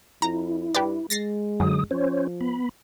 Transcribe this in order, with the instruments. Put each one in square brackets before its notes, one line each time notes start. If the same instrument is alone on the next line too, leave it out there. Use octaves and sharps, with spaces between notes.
[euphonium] F2 [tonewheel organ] E4 [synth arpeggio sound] A#5
[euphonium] G2 [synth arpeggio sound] G4 B4 D5
[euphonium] G#3 [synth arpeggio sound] A6 A#6 C7
[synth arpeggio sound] F#2 [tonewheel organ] D3 F#3 D#6
[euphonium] F3 [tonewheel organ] C#4 C5 C#5
[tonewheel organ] B3 B5